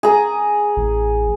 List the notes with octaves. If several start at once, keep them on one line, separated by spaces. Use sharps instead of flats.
G#4 A#5
A1